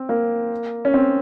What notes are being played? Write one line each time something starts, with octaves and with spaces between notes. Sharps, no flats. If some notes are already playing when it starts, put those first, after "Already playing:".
Already playing: C4
A#3
C#4
C4